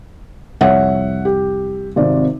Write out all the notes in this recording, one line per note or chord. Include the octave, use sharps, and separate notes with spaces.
C2 F2 C#5 E5 F#5
G4
G#1 C3 D5